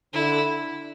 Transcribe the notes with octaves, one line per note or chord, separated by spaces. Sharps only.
D3 E4